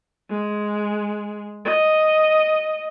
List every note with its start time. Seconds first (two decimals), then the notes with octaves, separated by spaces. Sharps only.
0.30 G#3
1.66 D#5